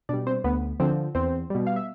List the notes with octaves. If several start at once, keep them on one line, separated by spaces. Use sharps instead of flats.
B2 G3 D4 D5
C4 C5
D2 B3 B4
D3 F3 C4 C5
E2 C4 C5
B2 G3
F5
E5